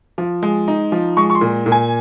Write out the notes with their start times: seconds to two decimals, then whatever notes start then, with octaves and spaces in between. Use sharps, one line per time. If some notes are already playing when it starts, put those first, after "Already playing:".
0.18 F3
0.43 G#3
0.68 D#4
0.92 F3
1.17 G#3 C#6
1.30 C#6
1.35 C6
1.41 A#2
1.66 A#2
1.72 G#5